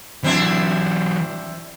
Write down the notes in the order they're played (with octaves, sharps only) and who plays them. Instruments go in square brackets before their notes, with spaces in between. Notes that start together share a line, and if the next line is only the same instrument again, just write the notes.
[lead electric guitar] E3 F#3 [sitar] C4 D4 E4